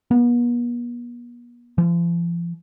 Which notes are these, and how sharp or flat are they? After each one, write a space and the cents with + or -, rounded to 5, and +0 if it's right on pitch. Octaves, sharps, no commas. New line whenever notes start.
B3 -45
F3 -40